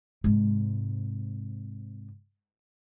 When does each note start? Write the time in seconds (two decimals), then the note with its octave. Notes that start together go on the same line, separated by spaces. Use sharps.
0.24 G#2 C3